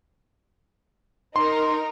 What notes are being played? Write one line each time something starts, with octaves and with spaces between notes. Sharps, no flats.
D#4 A#4 C6